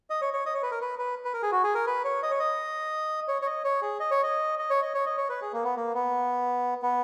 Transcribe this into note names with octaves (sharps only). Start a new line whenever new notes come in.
D#5
C#5
C#5
D#5
C#5
B4
A#4
B4
B4
B4
A#4
G#4
F#4
G#4
A#4
B4
C#5
D#5
C#5
D#5
C#5
C#5
D#5
C#5
G#4
D#5
C#5
D#5
D#5
C#5
D#5
C#5
D#5
C#5
B4
G#4
A#3
B3
A#3
B3
B3